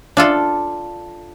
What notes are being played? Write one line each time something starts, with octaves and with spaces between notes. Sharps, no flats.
D4 F4 A4